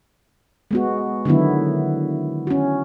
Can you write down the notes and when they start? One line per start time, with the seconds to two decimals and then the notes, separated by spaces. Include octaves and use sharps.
0.71 G#3 B3 F#4
1.25 D3 D#3 F#3 B3 E4
2.47 C#4 F#4